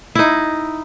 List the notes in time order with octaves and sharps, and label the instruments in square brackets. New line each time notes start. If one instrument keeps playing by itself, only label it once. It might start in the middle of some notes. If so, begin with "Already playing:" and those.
[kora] D#4 E4